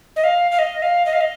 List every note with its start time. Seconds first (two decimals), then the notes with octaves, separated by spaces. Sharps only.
0.16 D#5
0.24 F5
0.51 F5
0.59 D#5
0.82 F5
1.06 D#5
1.13 F5
1.21 D#5